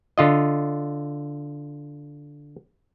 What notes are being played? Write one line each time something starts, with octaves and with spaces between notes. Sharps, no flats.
D3 F4 D#5